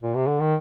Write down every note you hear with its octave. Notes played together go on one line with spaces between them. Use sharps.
A#2
C3
D3
D#3